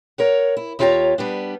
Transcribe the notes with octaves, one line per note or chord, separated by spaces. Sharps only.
A#4 C#5 F#5
E4
D#2 E4 F4 G4 C#5 A#5
G3 B3 D4